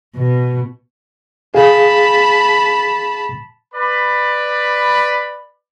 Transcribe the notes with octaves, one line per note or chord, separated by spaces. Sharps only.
B2
G#4 F5 A5 B5
B4 D5 B5